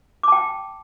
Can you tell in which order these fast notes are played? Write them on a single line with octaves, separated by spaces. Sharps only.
D6 A5 G5